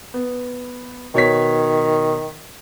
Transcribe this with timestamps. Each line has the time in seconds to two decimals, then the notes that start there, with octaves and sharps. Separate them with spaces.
0.14 B3
1.15 B2 D#3 C#5 B6